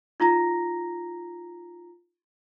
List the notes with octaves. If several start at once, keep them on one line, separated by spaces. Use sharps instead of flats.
D#4 F4 A#5 A#6